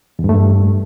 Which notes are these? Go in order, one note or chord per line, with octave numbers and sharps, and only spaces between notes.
E2
G2
A3
G2